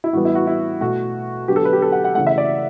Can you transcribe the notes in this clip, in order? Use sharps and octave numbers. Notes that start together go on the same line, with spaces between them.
E4
A2 E3 G3 B3 F#4
E4
F#4
E4
B2 A3 F#4
D3 F#3 B3 G4
A4
B4
G4
A4
F#5
F#5
C#3 E3 A3 F#5
E5
D5